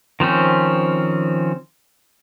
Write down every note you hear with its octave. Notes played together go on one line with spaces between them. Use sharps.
D#3 F3 C4 C#4